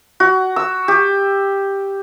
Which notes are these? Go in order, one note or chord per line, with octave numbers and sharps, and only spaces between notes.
F#4
E6
G4